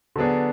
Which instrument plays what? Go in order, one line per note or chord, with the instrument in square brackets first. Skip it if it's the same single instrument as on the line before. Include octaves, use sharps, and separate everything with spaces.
[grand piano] D3 F#3 B3 D4 G#4